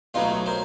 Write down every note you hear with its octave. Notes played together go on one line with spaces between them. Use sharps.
B1 B2 F#3 A3 D#4 F4
A#4 C5